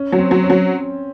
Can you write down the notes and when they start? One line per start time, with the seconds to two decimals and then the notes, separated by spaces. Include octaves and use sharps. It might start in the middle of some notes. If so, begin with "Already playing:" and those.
Already playing: C#4
0.12 F#3
0.18 C4
0.31 F#3
0.44 C#4
0.50 F#3